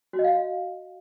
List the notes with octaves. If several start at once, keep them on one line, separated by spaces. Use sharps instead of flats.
F#4
D#5
F5